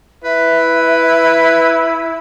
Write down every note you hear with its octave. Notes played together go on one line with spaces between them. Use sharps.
E4 B4 E5